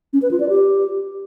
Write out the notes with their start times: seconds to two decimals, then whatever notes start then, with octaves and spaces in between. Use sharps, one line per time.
0.13 C#4
0.22 B4
0.31 F4
0.40 D5
0.49 G4